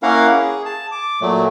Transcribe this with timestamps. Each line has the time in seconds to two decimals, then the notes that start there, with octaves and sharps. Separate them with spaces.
0.03 A#3 C#4 E4 A#4 F5 F#5
0.32 G#4
0.65 A5
0.91 D6
1.21 A#2 F#3 A3